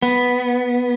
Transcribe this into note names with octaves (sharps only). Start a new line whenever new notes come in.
B3